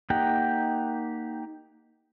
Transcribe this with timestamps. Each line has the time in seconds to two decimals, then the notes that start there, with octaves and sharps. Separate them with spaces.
0.10 A#3 D#4 G4 F#5 G5